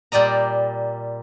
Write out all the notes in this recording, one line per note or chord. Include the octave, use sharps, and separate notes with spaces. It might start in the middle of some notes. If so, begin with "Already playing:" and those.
A#2 G3 D5 D#5 A#5